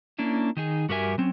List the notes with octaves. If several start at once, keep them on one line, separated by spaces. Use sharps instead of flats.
A#3 C#4 D4 E4
D#3 D#4 G#4
G2 F#4 G4 A#4 E5 G#5
F#3 C4 C#4